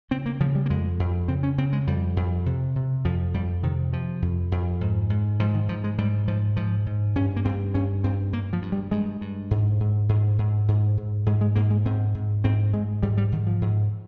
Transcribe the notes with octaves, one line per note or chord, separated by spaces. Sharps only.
C#3 C4
A#3
C#3 F3
G3
A#3
F2 G#3
F2
C#3 C4
C#4
C#3 C4
G#3
F2 G3
F2
C3
C3
F2 F3
F2 G3
C3 D#3
C3 F3
F2
F2
G#2
G#2
G#2 F3
D#3
G#2 F3
G#3
G#2 G3
G#2 F3
G#2 F3
G#2
G2 C#4
A#3
G2 C4
G2 C#4
G2 C4
G2 A#3
F3
G2
G3
G2 G#3
G2
G#2
G#2
G#2
G#2
G#2
G#2
G#2 G#3
G#3
G#2 A#3
G#3
G#2 C4
G#2
G#2 C4
G#2 G#3
G#2 G3
G3
G#2 D#3
F3
G#2